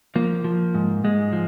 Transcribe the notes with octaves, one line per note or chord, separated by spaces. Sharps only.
F3 A#3
F3
G#2
G#2 G#3
F3